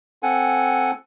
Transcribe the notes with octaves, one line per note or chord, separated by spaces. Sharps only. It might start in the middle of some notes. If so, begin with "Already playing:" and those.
C4 A4 F#5 G#5